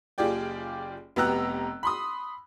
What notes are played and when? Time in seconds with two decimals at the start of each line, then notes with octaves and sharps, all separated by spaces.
0.18 F#1 F4 G4 G#4 D5 G5
1.16 F1 B3 G4 A#5 E6 F#6
1.83 B5 C6 D#6